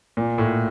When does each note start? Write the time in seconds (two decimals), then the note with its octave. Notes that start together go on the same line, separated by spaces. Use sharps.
0.17 A#2
0.38 A2